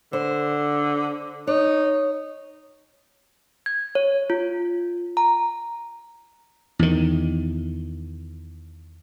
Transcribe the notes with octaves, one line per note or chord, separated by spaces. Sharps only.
D3 C5
D#4 C#5
G#6
C#5
F4
A#5
E2 D#3